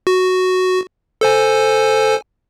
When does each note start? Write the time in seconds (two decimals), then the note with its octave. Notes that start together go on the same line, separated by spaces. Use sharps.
0.07 F#4
1.21 A4 C5 G#5